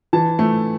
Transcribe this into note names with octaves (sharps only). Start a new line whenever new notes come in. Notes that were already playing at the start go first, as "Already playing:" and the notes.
E3 A5
A3